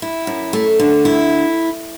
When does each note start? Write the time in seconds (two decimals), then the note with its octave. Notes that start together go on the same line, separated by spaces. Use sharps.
0.02 E4
0.27 F#2
0.53 A3
0.79 D3
1.05 E4